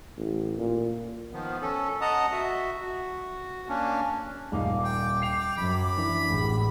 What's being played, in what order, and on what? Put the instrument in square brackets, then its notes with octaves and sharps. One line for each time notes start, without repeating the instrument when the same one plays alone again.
[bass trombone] A1
A#2
[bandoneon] D#3 F3 B3
C#4 A4
D#5 F#5 A5 A#5 D#6
F#4 E5
F#4
A#3 C#4 D4
[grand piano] D#1 D#4 F5 [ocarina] D6
[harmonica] G5
[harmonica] G5 [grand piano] C7 F7
[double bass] F#2 [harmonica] B5
[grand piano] E3 D4
[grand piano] E1 [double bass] A1